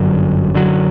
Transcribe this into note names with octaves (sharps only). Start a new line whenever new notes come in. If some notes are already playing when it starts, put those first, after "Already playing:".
Already playing: G1 F#2 D3 F#3
F#2 D3 F#3